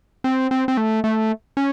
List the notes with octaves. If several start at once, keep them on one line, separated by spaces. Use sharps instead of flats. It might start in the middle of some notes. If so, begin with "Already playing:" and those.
C4
C4
C4
A3
A3
C#4